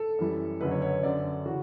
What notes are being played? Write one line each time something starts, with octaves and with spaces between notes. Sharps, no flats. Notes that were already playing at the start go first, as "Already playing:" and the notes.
Already playing: A4
F#2 E3 G3
F#1 F#2 D3 F#3 B4
C#5
C#5
G1 F#2 D3 D5
C#3 E3 F#4